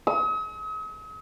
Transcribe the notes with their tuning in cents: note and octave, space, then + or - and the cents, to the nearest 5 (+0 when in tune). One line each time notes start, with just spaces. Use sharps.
D#6 +45